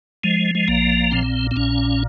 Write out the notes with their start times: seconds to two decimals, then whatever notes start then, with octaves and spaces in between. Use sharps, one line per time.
0.24 F3 G#3
0.55 G#3
0.68 A#1 A#3
1.11 A#2 C4
1.51 C4
1.56 A#1 C#4